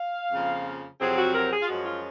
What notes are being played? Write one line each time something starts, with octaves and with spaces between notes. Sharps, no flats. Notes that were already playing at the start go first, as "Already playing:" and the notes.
Already playing: F5
F2 C#3 F3 A#3
F2 C3 F#3 C4 G#4
F#4
A#4
G#4
F4
F#2 F3 G#3 C#4 F#4
F4